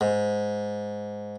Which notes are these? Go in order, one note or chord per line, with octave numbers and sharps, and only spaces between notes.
G#2